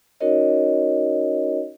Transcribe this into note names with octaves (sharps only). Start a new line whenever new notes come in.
C#4 D#4 F#4 A#4 C#5 D#5